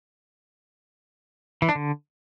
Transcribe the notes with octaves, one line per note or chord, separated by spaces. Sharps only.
E3
D4
D3